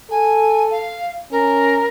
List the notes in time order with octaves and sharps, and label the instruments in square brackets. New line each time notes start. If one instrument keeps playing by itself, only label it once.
[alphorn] A4 [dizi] G#5
[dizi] F5
[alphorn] C#4 [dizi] A#4